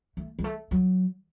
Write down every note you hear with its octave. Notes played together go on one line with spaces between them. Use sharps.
A3
G#3
A3
F#3